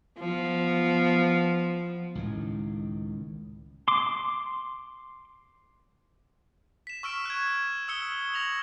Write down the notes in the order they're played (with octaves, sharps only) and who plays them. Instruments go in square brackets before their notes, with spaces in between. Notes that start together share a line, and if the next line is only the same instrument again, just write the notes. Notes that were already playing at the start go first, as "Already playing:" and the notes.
[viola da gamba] F3 B3
[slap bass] C#2 A2 D#3
[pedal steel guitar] C6 D6
[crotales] B6 E7
C#6 E6 F6 D7
F#6 G#6
D#6 E6 C#7 G7
E6 A#6 F7 F#7